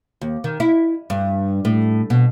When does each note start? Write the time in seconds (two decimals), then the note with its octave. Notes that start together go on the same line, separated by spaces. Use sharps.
0.21 D#2
0.44 D#3
0.60 E4
1.10 G2
1.65 A2
2.10 B2